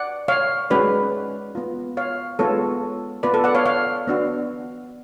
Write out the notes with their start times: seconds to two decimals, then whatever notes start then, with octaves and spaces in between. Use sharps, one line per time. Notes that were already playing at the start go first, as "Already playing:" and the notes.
Already playing: D5 F#5
0.28 C#5 F5
0.70 G#3 C#4 F#4 B4 D5
1.55 B3 F4
1.97 C#5 F5
2.39 G#3 B3 F4 A4 C#5
3.23 B3 F4 B4 D5
3.34 A4
3.44 D5 F#5
3.55 C#5 F5
3.66 C#5 F5
4.08 B3 D4 F#4